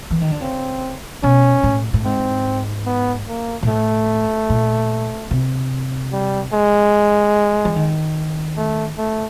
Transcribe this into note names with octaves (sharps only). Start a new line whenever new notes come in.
E3
D#3
D3
C#3 C4
B2 C#4
A2
A2
G#2 C4
B3
A#3
A#2
A2 A3
A#2
C3
G3
G#3
E3
D#3
A3
A3